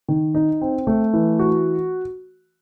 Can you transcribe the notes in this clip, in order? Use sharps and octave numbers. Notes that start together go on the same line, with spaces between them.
D#3
D#4
C4
A3
E3
F#4